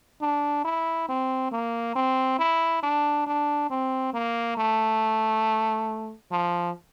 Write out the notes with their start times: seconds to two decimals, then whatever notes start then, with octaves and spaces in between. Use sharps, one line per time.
0.22 D4
0.65 E4
1.09 C4
1.52 A#3
1.96 C4
2.39 E4
2.83 D4
3.27 D4
3.70 C4
4.14 A#3
4.57 A3
6.32 F3